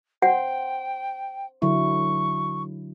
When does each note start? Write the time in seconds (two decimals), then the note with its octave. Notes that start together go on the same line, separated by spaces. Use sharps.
0.22 C5 F#5 G5
1.62 D3 F#3 E4 C#6